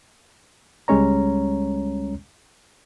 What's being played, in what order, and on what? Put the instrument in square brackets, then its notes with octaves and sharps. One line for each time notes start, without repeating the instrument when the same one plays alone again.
[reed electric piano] C#2 G3 G#3 C#4 C#5 A#5